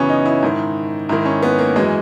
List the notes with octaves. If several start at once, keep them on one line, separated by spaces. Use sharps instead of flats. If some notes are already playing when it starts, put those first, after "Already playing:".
Already playing: F#2 C#3 E3 B3 C#4
D#4
E4
G#2 D#3
G#2 D#3 E4
C#4
B3
A#3
F#2 E3 G#3